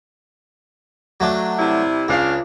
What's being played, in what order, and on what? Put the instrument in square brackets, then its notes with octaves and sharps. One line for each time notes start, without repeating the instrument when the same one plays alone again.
[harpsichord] F#3 A3 D4
[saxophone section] C3 G3 E4
[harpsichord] C#2 [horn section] C#3 D4 F5